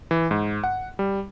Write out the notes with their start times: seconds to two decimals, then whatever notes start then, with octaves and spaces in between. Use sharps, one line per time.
0.11 E3
0.31 G#2
0.64 F#5
0.99 G3